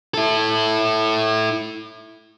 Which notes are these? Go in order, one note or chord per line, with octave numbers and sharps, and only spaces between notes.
E4 A4